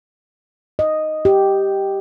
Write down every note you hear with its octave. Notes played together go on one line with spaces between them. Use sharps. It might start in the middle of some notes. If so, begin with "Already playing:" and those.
D#5
G4